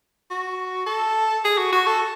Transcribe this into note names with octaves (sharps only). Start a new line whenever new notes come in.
F#4
A4
G#4
F#4
F#4
A4